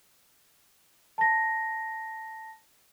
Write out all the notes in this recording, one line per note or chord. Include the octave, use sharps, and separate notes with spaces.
A5 A#6